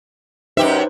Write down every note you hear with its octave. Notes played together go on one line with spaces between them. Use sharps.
F#2 D#4 G4 B4 C5 E5